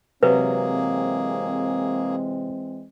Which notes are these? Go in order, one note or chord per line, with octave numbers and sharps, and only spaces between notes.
C3 E3 F#3 G#3 A#3 C4 G#4 B4